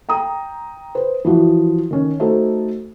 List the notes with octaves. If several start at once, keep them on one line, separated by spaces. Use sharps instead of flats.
G5 A#5 D#6
B4 C5
E3 F3 F#4
D#3 C#4
A3 D#4 F#4 A4 C5